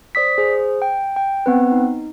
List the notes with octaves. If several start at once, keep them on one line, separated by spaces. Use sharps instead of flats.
C5 D5 D#6 B6
G#4 C5
G5
G5
B3 C4 B4
D#4